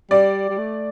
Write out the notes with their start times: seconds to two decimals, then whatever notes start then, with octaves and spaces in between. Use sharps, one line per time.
0.11 G3 D5
0.50 G3
0.58 A3